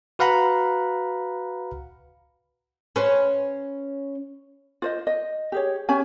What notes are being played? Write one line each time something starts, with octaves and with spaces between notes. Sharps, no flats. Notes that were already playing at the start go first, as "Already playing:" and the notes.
F#4 B4 F5 F#5 A#5 B5
C#4 B4 C5
F4 C5 D#5
D#5
G4 G#4 C#5
C#4 G4 G#5